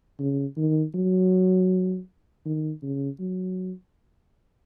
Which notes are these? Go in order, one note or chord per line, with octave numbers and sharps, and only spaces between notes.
C#3
D#3
F#3
D#3
C#3
F#3